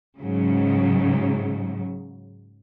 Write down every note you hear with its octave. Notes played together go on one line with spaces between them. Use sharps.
G#2 C#3 F#3